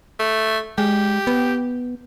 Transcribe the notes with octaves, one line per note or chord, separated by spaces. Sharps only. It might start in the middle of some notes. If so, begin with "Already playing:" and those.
A3
G#3 G4
B3